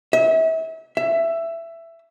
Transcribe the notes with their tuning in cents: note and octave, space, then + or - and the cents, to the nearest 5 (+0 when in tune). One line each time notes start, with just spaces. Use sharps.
E5 -35
E5 +15